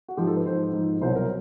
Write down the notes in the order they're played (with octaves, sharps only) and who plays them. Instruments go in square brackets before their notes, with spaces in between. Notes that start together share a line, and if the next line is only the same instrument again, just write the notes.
[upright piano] F#4
G#2 F3 G4
A4
B4
G#2 F3 C5
G#2 F3
C2 B2 F#3 C5
A#4